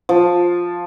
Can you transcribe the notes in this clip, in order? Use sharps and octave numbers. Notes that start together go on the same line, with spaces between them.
F3